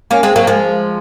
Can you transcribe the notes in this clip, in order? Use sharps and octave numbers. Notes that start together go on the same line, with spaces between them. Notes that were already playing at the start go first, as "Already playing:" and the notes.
A#3 C#4
G#3 C4
F#3 A#3
F3 G#3